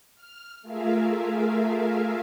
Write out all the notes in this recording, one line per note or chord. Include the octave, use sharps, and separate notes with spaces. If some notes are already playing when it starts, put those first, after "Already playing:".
F6
A3 F4 G#4 A#4 E5 F5